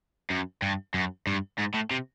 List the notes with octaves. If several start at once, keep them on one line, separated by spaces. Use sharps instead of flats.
F#2
G2
F#2
G2
G#2
A2
C3